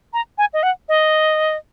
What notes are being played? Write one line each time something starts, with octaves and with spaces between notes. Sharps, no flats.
A#5
G#5
D#5
F#5
D#5